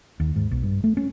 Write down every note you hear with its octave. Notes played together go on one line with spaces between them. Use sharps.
D#2
G#2
B1
G2
A3
C#4